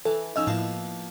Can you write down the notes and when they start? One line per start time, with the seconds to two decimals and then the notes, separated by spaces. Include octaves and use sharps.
0.05 E3 A4
0.36 F3 C#4 D#4 D#5 E6
0.47 A2 F3 A#3 B3 E4